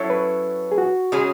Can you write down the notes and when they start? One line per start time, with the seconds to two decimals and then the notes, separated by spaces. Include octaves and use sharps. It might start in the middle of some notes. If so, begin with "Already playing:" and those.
Already playing: F#3 C#4 E4 A4
0.10 B4
0.72 G#4
0.78 F#4
1.12 C#3 G#3 C#4 G#4